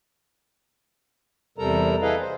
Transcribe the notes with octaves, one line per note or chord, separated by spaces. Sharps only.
E2 C3 G3 A4 A#4 A#5
E4 G#4 A4 B4 D#5 F5
C5